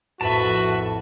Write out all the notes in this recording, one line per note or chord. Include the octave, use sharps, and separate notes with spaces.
A#1 F2 A2 F#4 B4 E5 A5